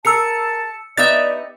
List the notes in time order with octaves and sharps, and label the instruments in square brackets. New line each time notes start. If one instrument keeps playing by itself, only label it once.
[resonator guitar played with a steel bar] G#4 A#4 [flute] A5 [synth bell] E6 C#7
[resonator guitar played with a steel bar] B3 D#4 G4 [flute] D5 [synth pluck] E5 A6